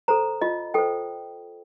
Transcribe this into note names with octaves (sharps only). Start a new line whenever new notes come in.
A4 C5 A#5
F4 D#5
A4 C5 G5